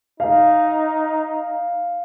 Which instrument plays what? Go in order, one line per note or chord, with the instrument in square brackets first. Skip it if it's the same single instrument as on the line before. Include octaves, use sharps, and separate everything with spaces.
[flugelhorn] D#4 [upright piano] F5